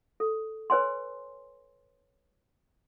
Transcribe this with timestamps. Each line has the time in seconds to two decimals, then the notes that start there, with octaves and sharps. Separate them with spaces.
0.20 A4
0.70 B4 C#5 G#5 C6